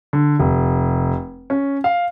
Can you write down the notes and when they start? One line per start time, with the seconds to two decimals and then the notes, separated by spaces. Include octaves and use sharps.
0.13 D3
0.40 F1
1.50 C#4
1.84 F5